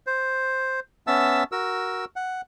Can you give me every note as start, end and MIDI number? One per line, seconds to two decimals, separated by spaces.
0.07 0.80 72
1.07 1.43 59
1.07 1.43 61
1.07 1.43 76
1.07 1.43 81
1.07 1.43 88
1.52 2.05 66
1.52 2.05 70
1.52 2.05 88
2.16 2.41 78